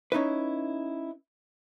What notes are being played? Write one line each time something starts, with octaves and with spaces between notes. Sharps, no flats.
C#4 D#4 E4 B4